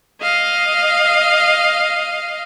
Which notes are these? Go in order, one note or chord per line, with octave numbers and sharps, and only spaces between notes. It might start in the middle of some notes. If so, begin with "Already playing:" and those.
D#5 F5